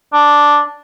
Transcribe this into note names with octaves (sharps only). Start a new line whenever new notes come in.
D4